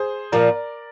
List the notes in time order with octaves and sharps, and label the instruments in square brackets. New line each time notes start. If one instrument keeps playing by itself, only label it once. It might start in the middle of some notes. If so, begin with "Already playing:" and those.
Already playing: [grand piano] G#4 C5
[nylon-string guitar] A#2 F3 A#3 [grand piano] A#4 D5